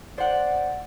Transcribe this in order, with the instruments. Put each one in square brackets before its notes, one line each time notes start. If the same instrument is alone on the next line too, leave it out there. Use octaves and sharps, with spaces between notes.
[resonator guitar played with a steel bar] C5 F#5 [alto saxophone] D5